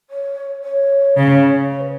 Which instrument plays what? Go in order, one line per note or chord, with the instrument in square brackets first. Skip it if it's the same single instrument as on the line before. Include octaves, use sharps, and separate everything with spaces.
[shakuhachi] C#5
C#5
[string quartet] C#3
[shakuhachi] C#5
B4